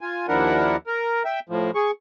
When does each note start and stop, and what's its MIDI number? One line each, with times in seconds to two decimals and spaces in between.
0.01 0.26 65
0.01 0.26 80
0.28 0.76 39
0.28 0.76 53
0.28 0.76 62
0.28 0.76 64
0.28 0.76 70
0.28 0.76 78
0.87 1.23 70
1.25 1.40 76
1.25 1.40 79
1.49 1.71 45
1.49 1.71 53
1.75 1.91 68
1.75 1.91 85